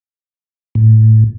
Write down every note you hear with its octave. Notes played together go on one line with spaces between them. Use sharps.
A2